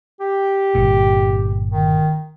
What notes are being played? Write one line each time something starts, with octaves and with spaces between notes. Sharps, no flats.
G4
G1 A#2
D#3